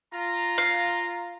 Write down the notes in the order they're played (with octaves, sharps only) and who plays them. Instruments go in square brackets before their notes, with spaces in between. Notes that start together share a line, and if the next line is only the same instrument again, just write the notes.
[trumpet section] F4 A#5
[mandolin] F5